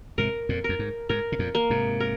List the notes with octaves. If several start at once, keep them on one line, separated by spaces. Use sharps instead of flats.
G#2 C3 A#4
F2 A#2
F2 A#4
G#2
G#2 A#4
C3
F2 A#2
A#3
G#2 C3
A#4